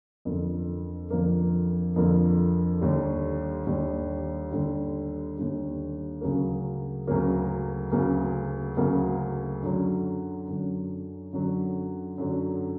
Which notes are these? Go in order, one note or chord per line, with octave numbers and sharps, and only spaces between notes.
F2 D3 F3 A#3
F2 D3 F3 A#3
F2 D3 F3 A#3
D#2 D3 G3
D#2 D3 G3
D#2 D3 G3
D#2 D3 G3
D2 C#3 F#3 A#3
D2 C#3 F#3 A#3
D2 C#3 F#3 A#3
D2 C#3 F#3 A#3
F#2 D3 F#3
F#2 D3 F#3
F#2 D3 F#3
F#2 D3 F#3